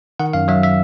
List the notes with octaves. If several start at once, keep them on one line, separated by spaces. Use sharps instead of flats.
D#3 F#5
F#2 F5
F#3 E5
E5